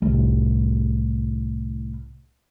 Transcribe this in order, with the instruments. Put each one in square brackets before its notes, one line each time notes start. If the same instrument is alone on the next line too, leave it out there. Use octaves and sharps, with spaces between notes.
[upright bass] C2 A2